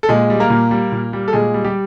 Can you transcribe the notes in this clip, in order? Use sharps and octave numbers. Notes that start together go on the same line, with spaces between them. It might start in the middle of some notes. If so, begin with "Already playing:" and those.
A4
A#2 G#3 G#4
G3
A#3 A#4
A#2
G3
A#2
G3
A4
A#2 G#3 G#4
G3
G3 G4